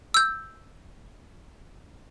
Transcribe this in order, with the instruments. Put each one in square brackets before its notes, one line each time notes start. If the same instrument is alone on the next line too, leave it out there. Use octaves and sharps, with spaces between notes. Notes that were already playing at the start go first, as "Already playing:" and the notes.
[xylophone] E6 G6